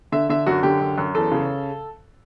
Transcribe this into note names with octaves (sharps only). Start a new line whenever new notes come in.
D3 E5
D3 E5
F#2 F#4
D3 G4
F#2
F#2
E2 A4
C#3